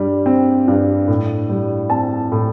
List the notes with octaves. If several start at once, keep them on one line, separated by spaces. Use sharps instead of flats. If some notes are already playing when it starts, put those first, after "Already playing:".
Already playing: G2 G3
C4
G2
A2
G3
C4 A5
A2